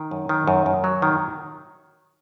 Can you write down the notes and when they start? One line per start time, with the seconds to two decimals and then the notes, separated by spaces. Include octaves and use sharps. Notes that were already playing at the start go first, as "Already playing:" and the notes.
Already playing: D#3
0.11 F#2
0.29 D#3
0.47 F#2
0.66 F#2
0.84 F#3
1.02 D#3